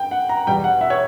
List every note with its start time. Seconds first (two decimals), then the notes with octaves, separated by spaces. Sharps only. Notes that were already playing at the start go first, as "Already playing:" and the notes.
Already playing: G5
0.11 F#5
0.29 A#5
0.47 E2 B2 G3 G5
0.64 F#5
0.81 E5
0.90 C#5